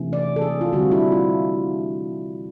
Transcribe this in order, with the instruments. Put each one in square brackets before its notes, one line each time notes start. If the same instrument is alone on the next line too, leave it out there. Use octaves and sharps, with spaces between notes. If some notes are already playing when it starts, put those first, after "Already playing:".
Already playing: [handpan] C3 E3 A3 C#4
D5
A4
G#4
F4
D3 G3 C4 F#4
E4
F4